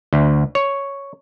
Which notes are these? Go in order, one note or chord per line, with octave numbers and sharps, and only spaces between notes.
D2
C#5